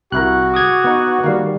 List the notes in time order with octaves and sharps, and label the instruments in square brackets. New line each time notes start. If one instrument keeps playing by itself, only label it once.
[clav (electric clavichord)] C2 E4 A#4 [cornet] F#4 [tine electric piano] F#6
[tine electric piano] D6 D#6 G#6
[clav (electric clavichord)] B3 D#4
[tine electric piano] D#3 G3 [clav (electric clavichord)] A#3 F5